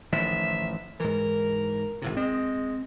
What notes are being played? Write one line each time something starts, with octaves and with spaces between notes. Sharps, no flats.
A1 D#3 F3 E5
G#2 E3 A#4
G#1 A2 C3
G#3 C4